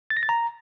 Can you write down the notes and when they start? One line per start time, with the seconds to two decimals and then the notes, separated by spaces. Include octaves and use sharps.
0.10 A6
0.17 A#6
0.23 A6
0.29 A#5